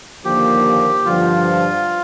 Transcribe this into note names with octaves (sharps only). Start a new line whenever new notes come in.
D#2 D3 F3 A#3 G4
G2 D3 F3 F4